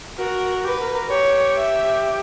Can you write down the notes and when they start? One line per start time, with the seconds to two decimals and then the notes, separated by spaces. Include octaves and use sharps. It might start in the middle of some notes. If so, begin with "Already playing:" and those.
0.18 F#4 A#4
0.64 G4 B4
0.80 A#4
0.94 A#4
1.09 G4 C#5
1.56 E5